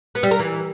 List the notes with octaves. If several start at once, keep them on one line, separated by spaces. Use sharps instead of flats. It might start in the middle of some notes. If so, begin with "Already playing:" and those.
B3
G3
A#4
E3